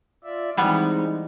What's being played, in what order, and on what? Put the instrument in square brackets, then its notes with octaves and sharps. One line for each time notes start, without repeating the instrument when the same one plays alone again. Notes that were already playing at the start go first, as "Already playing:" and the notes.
[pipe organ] F4 D5 E5
[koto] E3 G3 B3 [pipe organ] G#3 C4 D#4